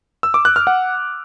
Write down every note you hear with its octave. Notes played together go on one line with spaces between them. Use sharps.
E6
D6
F#6
F6
F#5